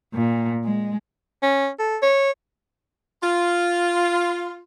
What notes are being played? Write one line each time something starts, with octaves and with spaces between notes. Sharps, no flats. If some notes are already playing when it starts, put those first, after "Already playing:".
A#2
G#3
C#4
A4
C#5
F4